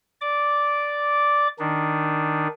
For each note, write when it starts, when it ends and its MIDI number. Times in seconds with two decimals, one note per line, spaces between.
0.21 1.48 74
0.21 1.48 86
1.59 2.47 51
1.59 2.47 62
1.59 2.47 63